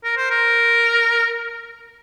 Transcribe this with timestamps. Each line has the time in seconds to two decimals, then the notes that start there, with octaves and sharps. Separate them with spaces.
0.04 A#4
0.17 C5
0.30 A#4